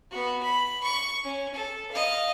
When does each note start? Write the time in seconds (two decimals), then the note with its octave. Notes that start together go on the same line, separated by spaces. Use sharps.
0.11 B3 F#4
0.43 B5
0.83 C#6
1.23 C#4
1.54 A4
1.91 D#5 F5